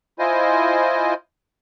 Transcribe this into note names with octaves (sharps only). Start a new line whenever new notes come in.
E4 F4 C5 D#5 G#5